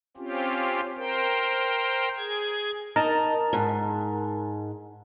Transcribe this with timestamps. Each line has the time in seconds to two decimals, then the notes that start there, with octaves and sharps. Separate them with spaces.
0.17 C4 C#4 F4 G4
0.97 A#4 C5 G5
2.18 G#4 G#6
2.96 D#4 A#4 A5
3.53 G#2